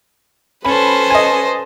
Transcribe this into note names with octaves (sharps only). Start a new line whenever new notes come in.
C#4 A4 B4 C5 A5 B5
D#5 G#5